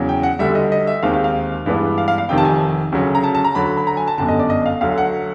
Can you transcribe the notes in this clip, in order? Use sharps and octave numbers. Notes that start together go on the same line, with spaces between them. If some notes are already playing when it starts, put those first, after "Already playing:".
Already playing: E2 C#3 F#3
G5
F#5
D2 D3 G3 E5
D#5
D#5
E5
D#2 D#3 G#3 C4 F5
F5
F5
G2 E3 G#3 B3 D4
F5
F5
F5
F1 F2 C3 D#3 G5
A5
G#5
D2 C#3 F#3
A#5
A5
A5
A#5
D2 D3 F#3 B5
B5
A#5
G#5
A5
G1 F#2 D3 A5
D#5
D5
D#5
F5
D2 D3 F#3 F5
F#5